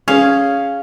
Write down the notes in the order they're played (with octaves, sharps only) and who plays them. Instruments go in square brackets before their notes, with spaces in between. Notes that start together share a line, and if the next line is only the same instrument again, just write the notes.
[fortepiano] C#4 [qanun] G#4 F5